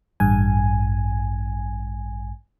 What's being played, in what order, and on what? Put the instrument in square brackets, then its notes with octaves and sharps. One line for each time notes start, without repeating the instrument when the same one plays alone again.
[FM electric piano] A1 G2 G#5